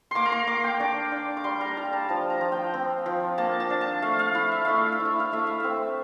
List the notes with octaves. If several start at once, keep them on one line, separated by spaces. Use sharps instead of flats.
A#3 C6 D6
A#5
C6
A#3 D6
G5
D4 D6
D4
D6
G3 C6
A#5
G3 A#5
A5
F3 A5
A#5
F3
G5
C4
F3
A#3 A5
A5
D4
A5
A3 F5
F5
E4 F5
E5
A3 F5
E5
F5
E4
E5
F5
A3 E5
F5
C4 E5